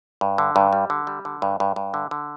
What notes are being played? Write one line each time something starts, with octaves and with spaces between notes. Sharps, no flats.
G2
D3
G2
G3
D3
G3
D3
G2
G2
G2
D3
D3